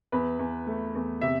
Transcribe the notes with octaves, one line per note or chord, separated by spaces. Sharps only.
E2 B4
E2
A3
E2
C3 E5